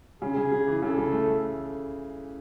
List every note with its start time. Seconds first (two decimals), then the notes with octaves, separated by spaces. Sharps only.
0.21 C#3 G#4
0.36 C#3
0.51 C#3
0.67 E3
0.82 C#3 A4
0.98 C#3
1.12 A3
1.28 A3